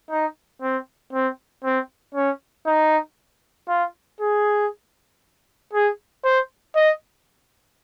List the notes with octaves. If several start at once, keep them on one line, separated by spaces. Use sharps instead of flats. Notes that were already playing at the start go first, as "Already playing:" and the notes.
D#4
C4
C4
C4
C#4
D#4
F4
G#4
G#4
C5
D#5